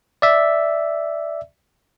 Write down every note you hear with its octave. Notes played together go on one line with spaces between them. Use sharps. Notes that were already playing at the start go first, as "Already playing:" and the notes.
D5 E5